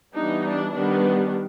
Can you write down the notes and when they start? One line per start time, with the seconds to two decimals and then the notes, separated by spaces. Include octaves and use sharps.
0.15 E3 G3 B3 D4 D#4
0.45 D4
0.74 D#3 G3 B3 D4